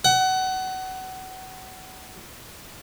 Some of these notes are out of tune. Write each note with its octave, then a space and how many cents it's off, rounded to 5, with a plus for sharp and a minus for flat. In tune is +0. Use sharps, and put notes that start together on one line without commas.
F#5 +25